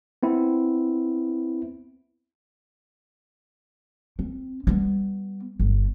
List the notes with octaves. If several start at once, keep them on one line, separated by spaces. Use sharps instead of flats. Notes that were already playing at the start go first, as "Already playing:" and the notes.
B3 C4 E4
C4
G3 B3
G1